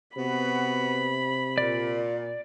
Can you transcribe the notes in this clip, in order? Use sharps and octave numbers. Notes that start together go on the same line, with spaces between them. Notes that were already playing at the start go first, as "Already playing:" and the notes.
C3 B3 F#4 B5
A#2 D5